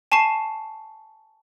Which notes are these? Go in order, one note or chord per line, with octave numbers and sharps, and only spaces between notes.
G#5 A5 C#6 C7 E7